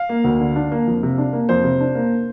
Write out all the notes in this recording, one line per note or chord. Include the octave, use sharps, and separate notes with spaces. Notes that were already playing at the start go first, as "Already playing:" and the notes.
Already playing: F5
A#3
D2
D3
D4
A#3
F2
C3
D4
A#3
F2 C5
C3
D4
A#3